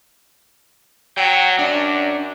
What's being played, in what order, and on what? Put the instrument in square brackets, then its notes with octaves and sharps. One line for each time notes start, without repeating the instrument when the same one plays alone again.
[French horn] F#3 [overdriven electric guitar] G5
[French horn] F#2 [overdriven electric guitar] D4